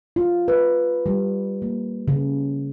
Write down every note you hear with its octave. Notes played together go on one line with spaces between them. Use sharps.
F4
B4
G3
A#3
C#3